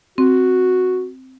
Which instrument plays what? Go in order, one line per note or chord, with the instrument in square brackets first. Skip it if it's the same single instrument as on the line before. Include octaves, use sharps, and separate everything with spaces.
[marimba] C4 [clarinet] F#4